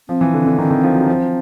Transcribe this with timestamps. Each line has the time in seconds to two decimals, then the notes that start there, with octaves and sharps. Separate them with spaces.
0.08 F3 C4
0.21 E3
0.34 D3
0.46 D3
0.58 D#3
0.70 D#3
0.83 F3
0.95 F#3
1.07 F3